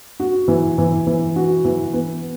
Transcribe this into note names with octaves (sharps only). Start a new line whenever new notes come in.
F#4
E3
E3
E3
F#4
E3
B3